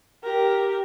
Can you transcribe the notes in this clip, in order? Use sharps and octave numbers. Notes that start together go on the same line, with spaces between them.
G4 A#4